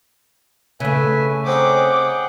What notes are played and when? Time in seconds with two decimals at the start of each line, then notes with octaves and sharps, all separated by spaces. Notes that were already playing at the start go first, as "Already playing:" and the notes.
0.80 C#3 A3 B4 E5 G#5
1.46 C4 D#4 G#4 C#5 F#5 G5 D6